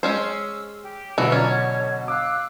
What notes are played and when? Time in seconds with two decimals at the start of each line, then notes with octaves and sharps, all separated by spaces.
0.03 G#3 C#4 C5 E6
0.81 G4
1.18 B2 D3 E3 F#3 F#4 B5 E6
1.32 C#4 F4 D5 A#5
1.46 C#5
2.08 F5 D6 E6 F#6